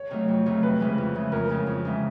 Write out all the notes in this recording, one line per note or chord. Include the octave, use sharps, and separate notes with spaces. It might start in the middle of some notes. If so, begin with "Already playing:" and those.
Already playing: C#5
C3 D#3 F#3 A3
F2
C3 D#3 F#3 A3
F2 B4
C#3 E3 G#3
F2
C#3 E3 G#3
F2 A#4
C#3 E3 G#3
F2
C#3 E3 G#3